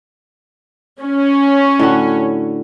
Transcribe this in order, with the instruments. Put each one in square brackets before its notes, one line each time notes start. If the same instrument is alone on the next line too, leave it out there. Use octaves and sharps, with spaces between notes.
[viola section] C#4
[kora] A2 D3 F#4